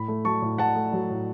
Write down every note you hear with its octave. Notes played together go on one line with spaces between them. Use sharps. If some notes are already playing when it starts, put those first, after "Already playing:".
Already playing: A2 B5
A3
F#3 A5 C#6
A2
A2 F#5 A5
A3
F#3
A2